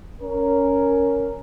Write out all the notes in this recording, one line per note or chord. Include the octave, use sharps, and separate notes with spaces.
C#4 A#4